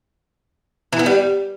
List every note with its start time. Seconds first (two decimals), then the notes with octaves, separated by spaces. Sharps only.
0.93 E3
0.99 B3
1.06 G3